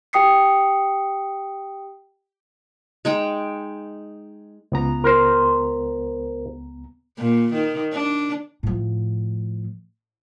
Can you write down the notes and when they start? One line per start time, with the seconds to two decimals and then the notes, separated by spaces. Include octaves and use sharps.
0.13 G4 G5 D#6 C7 C#7
3.05 G#3 D#4 G5
4.72 C#2 B3 A#5
5.04 A#4 C5
7.18 A#2
7.53 D#3
7.92 D4
8.63 A2 F3